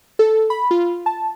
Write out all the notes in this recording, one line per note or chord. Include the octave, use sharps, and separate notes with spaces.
A4
B5
F4
A5